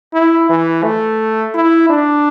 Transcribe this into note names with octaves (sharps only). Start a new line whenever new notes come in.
E4
E3
A3
E4
D4